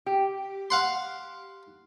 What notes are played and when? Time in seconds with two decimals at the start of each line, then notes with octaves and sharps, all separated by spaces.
0.06 G4
0.70 F5 F#5 C6